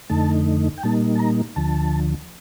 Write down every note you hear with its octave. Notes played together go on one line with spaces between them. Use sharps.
F2 D3 A3 D#4 A5
G5
A#2 G3 A#3 D#4 A5
A5
A#5
D2 D3 F3 A5